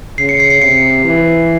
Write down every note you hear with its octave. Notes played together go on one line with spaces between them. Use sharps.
C#3 C7
C#7
C7
C7
C3 C#7
E3